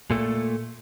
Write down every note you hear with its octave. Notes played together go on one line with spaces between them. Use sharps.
A#2 A3